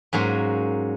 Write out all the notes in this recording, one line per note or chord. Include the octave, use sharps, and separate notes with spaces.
G#2 F#3 A#3 C#4